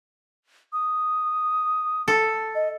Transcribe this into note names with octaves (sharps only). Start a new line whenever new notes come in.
D#6
A4
D#5